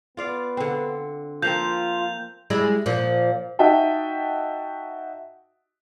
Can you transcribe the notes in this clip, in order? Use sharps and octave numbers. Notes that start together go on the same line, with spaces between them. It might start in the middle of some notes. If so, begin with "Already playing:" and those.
B3 F4 D5 F5
D3 C4
F3 A#3 C4 F4 G6 F7
G3 G#3 E4
A#2 F3
D#4 F#4 D#5 E5 G5 A5